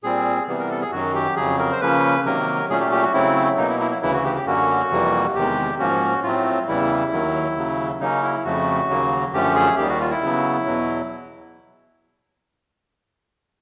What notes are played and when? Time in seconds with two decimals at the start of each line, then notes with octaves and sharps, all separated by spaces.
0.04 A#2 G3 C4 G#4
0.48 C3 E3 G3 B3
0.59 A#4
0.70 A4
0.82 G#4
0.92 F#2 D#3 F#3 F#4
1.15 G4
1.36 F2 C#3 F#3 G#4
1.59 A#4
1.72 C5
1.81 C#3 F3 A#3 C#4 B4
2.25 C3 D#3 F#3 A#3 A#4
2.70 A#2 F#3 A3 C#4 G#4
2.80 G4
2.92 G4
3.03 F#4
3.14 C#3 F#3 A3 C4 E4
3.57 B2 F#3 A#3 D#4
3.69 E4
3.80 E4
3.91 E4
4.02 D2 C#3 E3 E4
4.14 F#4
4.25 G4
4.36 G4
4.46 F#2 D3 F#3 A#3 C#4 F#4
4.91 F2 C3 E3 G3 A#3
5.35 E2 C3 D#3 G#3 G4
5.79 G#2 F3 A#3 C#4 F#4
6.23 A2 F#3 A3 C4 F4
6.67 E2 C#3 E3 G3 E4
7.13 D#2 D#3 F#3
7.56 D#2 C#3 F#3
8.01 C#3 F#3 A#3 C#4 D#4
8.23 E4
8.45 F2 C#3 F3 A3 F#4
8.89 D#2 C#3 F#3 A#3
9.33 F#2 D3 F3 A3 C#4 G4
9.56 G#4
9.77 D#2 D#3 G3 G4
9.89 F#4
10.00 F4
10.11 E4
10.23 C#3 F#3 B3
10.66 E2 B2 F#3